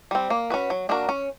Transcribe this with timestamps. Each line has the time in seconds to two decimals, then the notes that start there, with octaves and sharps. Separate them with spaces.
0.11 G3 C4
0.30 A#3
0.50 C#4 F#4 B4
0.70 F#3
0.89 A#3 D4 F#4 A#4
1.09 C#4